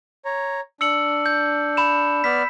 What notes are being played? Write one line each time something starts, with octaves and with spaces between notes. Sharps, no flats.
C#5 A#5
D4 E6 C#7 F#7
G6
B5 E7
B3 D5 F6 B6